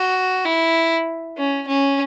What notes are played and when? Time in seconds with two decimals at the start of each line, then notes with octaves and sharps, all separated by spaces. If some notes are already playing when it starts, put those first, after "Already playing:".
Already playing: F#4
0.45 E4
1.37 C#4
1.67 C#4